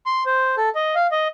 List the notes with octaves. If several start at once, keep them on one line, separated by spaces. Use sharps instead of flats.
C6
C5
A4
D#5
F5
D#5